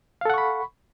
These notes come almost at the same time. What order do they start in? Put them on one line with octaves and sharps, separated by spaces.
F5 A4 F#5 C#6 B5